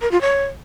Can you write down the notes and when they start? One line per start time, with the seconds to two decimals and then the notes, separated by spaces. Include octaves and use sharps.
0.01 A#4
0.11 F4
0.21 C#5